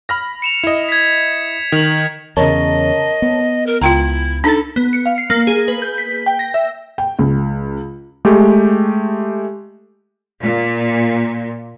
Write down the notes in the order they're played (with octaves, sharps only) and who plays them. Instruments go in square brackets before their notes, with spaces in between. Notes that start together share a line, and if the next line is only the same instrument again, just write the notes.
[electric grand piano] B5 F6 A#6
[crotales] C#7 E7 F7
[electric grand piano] E4 D#5
[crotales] G#6 B6
[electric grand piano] D#3 [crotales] F7 F#7
[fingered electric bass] E2 C#3 [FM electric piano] A#4 C#5 A5 [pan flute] D#5
[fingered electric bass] B3
[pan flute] A#4
[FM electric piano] C#2 [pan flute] E4 [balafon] F4 G5 A#5
[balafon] D4 D#4 [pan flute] A4 [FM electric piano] B5 A6
[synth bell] B3
C#7
F5
C7
A#3
G#4
B4
G6
B6
G5
A#6
E5
[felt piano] G5
C#2
[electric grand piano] G#3 A3 G4
[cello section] A#2